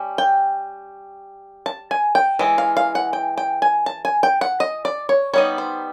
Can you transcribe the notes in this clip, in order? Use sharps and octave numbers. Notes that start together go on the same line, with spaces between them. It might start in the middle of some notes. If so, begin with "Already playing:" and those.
Already playing: G3 C#4
G5
A5
G#5
G5
E3 G#3
F5
F5
F#5
G5
G5
G#5
A5
G#5
G5
F#5
D#5
D5
C#5
G3 B3 D#4 C#5
C5